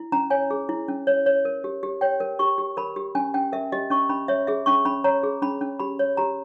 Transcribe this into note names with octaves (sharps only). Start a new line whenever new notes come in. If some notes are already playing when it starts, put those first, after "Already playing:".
Already playing: E4
C#4 A#5
C#5 G#5
G#4
E4
C#4
C#5
C#5
A#4
G4
G4
C#5 G5
A#4
G4 C#6
G4
A#4 B5
G4
C#4 G#5
C#4 G5
A#4 E5
G4 D#5
C#4 C#6
C#4 B5
C#5 E5
G#4 E5
C#4 C#6
C#4 B5
C#5 A#5
G#4
C#4 B5
C#4
G4 B5
C#5
G4 A#5